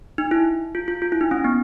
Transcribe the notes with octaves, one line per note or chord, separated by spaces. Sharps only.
D#4
E4
F4
F4
F4
E4
D#4
C#4
B3